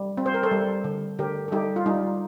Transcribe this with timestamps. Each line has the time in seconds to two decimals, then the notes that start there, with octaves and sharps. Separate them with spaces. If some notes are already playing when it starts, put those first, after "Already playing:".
Already playing: G3
0.17 C4
0.26 C5
0.34 A#4
0.43 A4 C5
0.51 G3
0.84 D3
1.19 D3 G4 A#4
1.48 A4
1.52 G3 D#4 G4
1.76 F4
1.86 G3 D#4